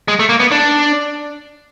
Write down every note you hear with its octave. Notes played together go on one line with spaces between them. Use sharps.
G#3
A3
A#3
B3
D4